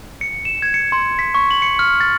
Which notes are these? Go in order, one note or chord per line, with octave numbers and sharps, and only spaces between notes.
C#7
E7
G#6
C#7
C6
B6
C#6
F#7
C#7
F6
A6